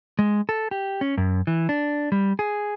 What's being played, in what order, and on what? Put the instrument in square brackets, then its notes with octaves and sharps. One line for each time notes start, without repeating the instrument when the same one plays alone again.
[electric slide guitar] G#3
A4
G4
C#4
F#2
E3
D4
G3
G#4